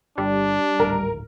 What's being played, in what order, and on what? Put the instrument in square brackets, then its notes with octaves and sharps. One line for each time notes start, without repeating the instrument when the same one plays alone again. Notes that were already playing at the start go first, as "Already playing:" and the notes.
[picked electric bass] G1 [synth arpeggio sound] G3 [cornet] D4
[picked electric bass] D1 G#1 [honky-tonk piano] A#4